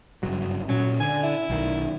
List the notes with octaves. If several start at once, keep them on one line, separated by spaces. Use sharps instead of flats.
F#1 G2 F#3
A#2 F#3 C#4
D3 G#5
E4
B1 D#3